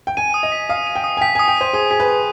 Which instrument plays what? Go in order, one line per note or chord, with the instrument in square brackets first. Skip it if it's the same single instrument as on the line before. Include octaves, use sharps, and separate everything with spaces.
[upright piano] G5
[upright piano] G#5 [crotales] D#7
[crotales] D#6
[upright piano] D#5
[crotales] B6
[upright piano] F5 [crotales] D#6
[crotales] D#7
[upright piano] G5
[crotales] D#6
[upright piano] G#5
[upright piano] G5 [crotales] B6
[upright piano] G#5 [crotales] D#6
[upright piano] G5
[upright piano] C5 [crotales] D#7
[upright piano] G#4 [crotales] D#6
[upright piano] G#4 [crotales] B6
[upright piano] B4
[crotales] D#6